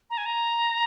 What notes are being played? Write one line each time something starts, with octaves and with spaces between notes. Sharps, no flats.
A#5
G#5
A#5